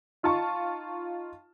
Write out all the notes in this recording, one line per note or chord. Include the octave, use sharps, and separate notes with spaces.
D#4 F4 F5 A5 C#6